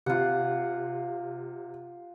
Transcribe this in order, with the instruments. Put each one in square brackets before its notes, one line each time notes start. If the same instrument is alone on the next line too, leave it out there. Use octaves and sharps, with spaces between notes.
[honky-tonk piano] C3 [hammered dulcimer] F4 F#5